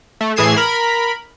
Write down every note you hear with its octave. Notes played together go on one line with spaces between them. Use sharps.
A3
A2 E3 G#4 G#6 C7 E7
A#4 B5